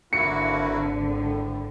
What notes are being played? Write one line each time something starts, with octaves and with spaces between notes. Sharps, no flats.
G#1 D3 A#3 E4 F#4 C#7
A2